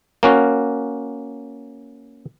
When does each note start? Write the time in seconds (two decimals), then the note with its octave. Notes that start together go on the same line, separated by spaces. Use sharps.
0.23 A#3 C#4 F#4